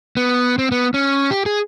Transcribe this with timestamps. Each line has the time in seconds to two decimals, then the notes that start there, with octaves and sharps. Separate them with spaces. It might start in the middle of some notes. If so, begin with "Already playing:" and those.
0.17 B3
0.59 C4
0.72 B3
0.94 C#4
1.31 G4
1.46 G#4